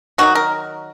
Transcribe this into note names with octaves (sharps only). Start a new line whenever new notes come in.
D#3 F#3 C4 D#4 F#4
A#4